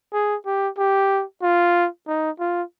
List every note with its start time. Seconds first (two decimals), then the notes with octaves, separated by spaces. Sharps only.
0.13 G#4
0.46 G4
0.78 G4
1.42 F4
2.08 D#4
2.40 F4